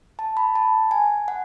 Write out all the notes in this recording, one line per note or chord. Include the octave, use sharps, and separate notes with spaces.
A5
B5
A5
G#5
F#5